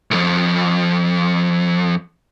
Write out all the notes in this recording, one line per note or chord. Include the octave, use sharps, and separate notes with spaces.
C2 F2